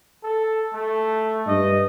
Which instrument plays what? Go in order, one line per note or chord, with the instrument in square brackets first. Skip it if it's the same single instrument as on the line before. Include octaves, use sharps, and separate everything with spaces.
[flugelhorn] A4
A3
[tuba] G2 [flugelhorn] D#5